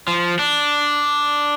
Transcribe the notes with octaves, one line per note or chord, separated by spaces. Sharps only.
F3
D4